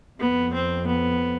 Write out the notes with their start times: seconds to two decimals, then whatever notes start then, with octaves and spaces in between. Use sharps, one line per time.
0.19 F2 B3
0.53 C4
0.87 B3